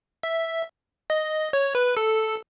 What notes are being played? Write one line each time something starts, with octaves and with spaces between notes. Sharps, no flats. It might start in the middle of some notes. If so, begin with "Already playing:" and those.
E5
D#5
C#5
B4
A4